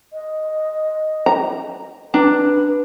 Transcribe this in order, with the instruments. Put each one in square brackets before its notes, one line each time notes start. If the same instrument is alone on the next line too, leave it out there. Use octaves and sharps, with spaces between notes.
[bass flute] D#5
[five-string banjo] A#5
[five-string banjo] D4 A#5 [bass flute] B4